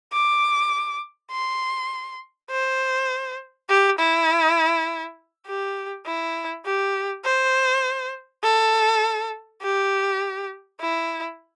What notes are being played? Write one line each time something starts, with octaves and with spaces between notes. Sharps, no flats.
D6
C6
C5
G4
E4
G4
E4
G4
C5
A4
G4
E4